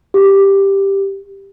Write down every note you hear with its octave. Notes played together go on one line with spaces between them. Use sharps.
G4